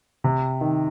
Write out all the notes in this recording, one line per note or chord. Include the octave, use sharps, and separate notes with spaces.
C3
D#3